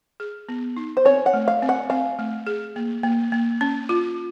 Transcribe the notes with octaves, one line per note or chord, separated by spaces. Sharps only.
G#4
B3
D#4
C5
C4 C#5
F#5
A3
F5
C4
F#5
C4 F5
A3
G#4
A#3
A#3
A#3
C#4
F4